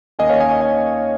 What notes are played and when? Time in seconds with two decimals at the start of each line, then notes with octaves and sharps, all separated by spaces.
0.19 D#2 D#3 A#3 C#4 D#5 G#5
0.30 C#5 F5
0.40 D#5 G#5
0.61 D#5 G#5